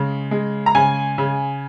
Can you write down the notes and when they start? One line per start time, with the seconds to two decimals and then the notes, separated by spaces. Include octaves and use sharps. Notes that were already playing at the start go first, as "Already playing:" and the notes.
Already playing: C#3 G#3
0.31 G#3
0.66 A#5
0.75 C#3 G#5
1.18 C#3